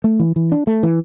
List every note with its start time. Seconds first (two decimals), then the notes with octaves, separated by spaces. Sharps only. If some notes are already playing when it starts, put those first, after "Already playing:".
0.04 A3
0.19 E3
0.36 E3
0.52 D4
0.67 A3
0.83 E3